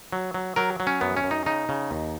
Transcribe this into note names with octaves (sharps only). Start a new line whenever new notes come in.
F#3
F#3
F#3 A#4
F#3
C#4
F#2 B3
C#4
F#2
D#4
C#3 D#4
C#3
D#2